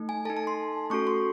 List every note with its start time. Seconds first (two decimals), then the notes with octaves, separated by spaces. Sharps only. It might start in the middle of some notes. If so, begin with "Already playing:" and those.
Already playing: A3 D#4
0.09 G#5
0.25 A4 A5
0.30 D#4
0.37 A5
0.47 C6
0.90 A3 C#4 F#4 A4 C#6
1.07 C6